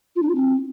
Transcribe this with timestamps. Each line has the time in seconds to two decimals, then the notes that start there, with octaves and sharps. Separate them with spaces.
0.15 F4
0.22 D4
0.28 F4
0.35 C4